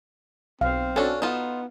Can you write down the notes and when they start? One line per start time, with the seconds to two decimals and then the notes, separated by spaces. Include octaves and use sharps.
0.61 B1 C4 F5
0.96 C#4 D4 F#4 A4
1.22 B3 D#4 F4 E7